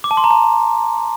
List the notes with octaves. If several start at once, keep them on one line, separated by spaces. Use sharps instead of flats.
D6
A5
C6
A#5
A5